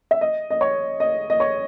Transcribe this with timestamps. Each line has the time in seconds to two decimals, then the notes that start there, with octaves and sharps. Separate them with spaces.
0.11 E5
0.21 D#5
0.50 D#5
0.61 C#5
1.00 D#5
1.30 D#5
1.40 C#5